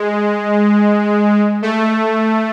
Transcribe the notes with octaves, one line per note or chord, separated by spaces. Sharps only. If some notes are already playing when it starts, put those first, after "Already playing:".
Already playing: G#3
A3